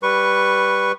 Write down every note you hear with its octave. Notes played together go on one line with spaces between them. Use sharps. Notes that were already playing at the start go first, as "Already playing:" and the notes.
G3 B4 C#6